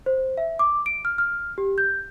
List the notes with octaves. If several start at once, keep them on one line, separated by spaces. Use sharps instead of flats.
C5
E5
D6
D7
F6
F6
G4
G6